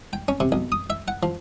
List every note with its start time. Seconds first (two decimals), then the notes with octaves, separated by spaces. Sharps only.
0.13 G5
0.28 C#4
0.40 C3
0.52 B1
0.72 D#6
0.90 E5
1.08 F#5
1.23 F3